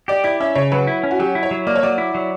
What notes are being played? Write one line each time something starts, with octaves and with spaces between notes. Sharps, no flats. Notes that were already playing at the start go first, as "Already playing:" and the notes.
G4 D5
E4 D5
C#4 E5
C#3 C#5
F#3 B4
E4
C#4
F#4
F#3 G4
E4
C#5
F#3
A#3 D5
C#5
F#3 D5
E4
F#3